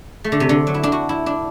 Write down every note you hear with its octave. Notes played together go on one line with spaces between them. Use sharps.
A3
D3
C3
D3
F#3
E4
D4
F#4
E4
D4